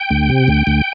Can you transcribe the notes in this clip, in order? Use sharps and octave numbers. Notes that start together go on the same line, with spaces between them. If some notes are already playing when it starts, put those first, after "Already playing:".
Already playing: G5
D2
C3
D2
D2